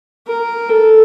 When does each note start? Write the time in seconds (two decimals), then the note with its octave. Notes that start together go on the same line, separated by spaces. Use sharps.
0.27 A#4
0.69 A4